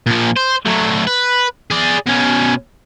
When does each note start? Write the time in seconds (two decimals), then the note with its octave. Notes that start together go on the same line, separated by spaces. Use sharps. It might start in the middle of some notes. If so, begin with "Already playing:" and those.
0.06 A#2 F3
0.36 C5
0.65 F#3 A3
1.07 B4
1.71 G#4 D5
2.07 B2 C#4